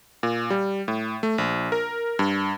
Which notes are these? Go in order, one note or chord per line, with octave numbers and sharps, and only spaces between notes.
A#2
G3
A2
A3
A#1
A#4
G2